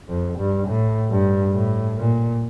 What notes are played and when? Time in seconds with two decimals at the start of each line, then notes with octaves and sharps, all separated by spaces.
0.09 F2
0.39 G2
0.68 A2
1.11 G2
1.53 A2
1.97 A#2